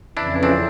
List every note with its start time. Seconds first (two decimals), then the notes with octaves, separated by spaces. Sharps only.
0.17 F2 C#3 E3 D4 E4
0.43 C4 D4